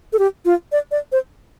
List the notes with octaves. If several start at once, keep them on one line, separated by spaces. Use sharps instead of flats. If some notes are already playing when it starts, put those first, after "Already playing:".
A4
G4
F4
D5
D5
C5